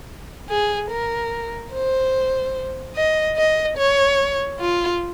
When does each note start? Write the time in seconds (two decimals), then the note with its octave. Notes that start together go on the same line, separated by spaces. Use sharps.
0.49 G#4
0.90 A#4
1.73 C5
2.96 D#5
3.37 D#5
3.77 C#5
4.60 F4